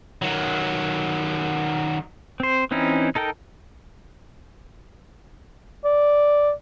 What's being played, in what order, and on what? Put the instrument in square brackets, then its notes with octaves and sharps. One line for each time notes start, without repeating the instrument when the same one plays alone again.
[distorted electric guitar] D#3 F#3
[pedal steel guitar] C4 C5
E3 C4 C#4 D#4 E4
D#4 A4 A#4 G5
[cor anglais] D5